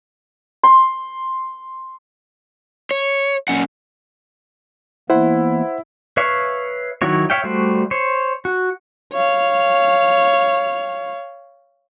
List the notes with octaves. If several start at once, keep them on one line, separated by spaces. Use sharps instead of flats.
C6
C#5
A#2 C#4 F#5
E3 A#3 B3 E4 C5 F#5
B4 C#5 E5 F5 C#6
D#3 F#3 E4 F#4 C#5
C#5 E5 F5 G5
G3 A3 F#4 C5
C5 C#5
F#4
C#5 F5